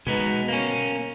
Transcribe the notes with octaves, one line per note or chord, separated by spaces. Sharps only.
B2 G#3 B3 D#4
A#3 C#4